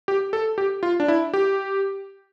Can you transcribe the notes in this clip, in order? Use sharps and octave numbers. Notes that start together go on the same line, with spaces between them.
G4
A4
G4
F4
D4
E4
G4